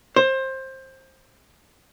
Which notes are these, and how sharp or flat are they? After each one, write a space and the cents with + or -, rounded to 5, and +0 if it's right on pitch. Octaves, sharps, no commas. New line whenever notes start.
C5 +20